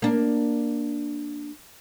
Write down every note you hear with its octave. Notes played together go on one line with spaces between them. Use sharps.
A#3 D4